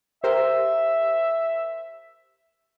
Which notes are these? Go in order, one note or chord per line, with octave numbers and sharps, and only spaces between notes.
G4 A#4 C5 E5